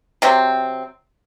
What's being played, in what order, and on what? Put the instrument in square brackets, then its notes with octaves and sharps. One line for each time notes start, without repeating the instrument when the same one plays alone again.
[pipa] C3 F#3 C4